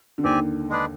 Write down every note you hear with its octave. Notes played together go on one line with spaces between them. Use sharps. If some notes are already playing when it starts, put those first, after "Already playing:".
D3
D#2 D#3 C4 G4 D5 G#5
G#3 D4 G#4 B4 D5